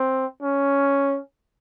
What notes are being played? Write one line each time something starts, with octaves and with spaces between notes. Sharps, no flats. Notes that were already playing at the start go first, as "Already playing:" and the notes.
Already playing: C4
C#4